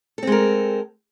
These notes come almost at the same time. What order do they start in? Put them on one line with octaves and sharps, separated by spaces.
A4 C4 G#3 A#4